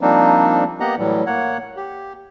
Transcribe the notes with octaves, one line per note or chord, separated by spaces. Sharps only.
F3 G3 A#3 C4 D4 D#4
A#3 B3 G4 D#5 F#5 A#5
A2 E3 F#3 G3
A#3 C#5 F#5
G4